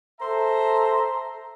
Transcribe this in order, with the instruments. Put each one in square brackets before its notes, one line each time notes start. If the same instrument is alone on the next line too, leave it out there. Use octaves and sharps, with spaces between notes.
[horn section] A4 C5 E5 A#5